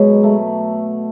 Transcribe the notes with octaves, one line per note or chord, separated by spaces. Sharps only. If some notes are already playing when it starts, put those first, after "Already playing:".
Already playing: B2 F#3 G#3
A3